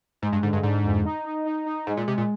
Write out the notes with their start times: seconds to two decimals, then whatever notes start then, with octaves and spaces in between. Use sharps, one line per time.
0.22 G#2 G#3
0.32 G2
0.43 G#2 D3
0.53 G2
0.63 G#2 D3
0.84 F2
1.05 D#4
1.25 D#4
1.46 D#4
1.66 D#4
1.87 G#2 G#3
1.97 A#2
2.08 C3 G#3
2.18 A#2